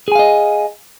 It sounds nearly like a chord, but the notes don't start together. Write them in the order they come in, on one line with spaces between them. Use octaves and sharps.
G#4 G#5 F5 D#5